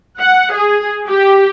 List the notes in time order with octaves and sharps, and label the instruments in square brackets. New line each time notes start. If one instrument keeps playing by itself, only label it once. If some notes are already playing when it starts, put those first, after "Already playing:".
[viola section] F#5
G#4
G4